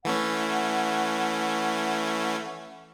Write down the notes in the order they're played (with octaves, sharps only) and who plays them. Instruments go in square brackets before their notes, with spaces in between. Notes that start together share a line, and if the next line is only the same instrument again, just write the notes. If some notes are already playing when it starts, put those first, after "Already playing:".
[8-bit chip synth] E3 A3 C#4 [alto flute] F#5